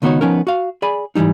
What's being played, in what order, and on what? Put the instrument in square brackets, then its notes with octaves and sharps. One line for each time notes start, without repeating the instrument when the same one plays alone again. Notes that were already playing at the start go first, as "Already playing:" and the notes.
[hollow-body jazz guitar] C#2 D#3 B3 D#4 F#4 C#5
F3 B3 C#4 D#4 A#4
F#4 F5
G#4 D5 G#5 B5
G#2 E3 F#3 G3 D#4